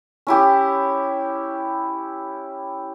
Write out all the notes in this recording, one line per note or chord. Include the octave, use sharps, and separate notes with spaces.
C#4 E4 G4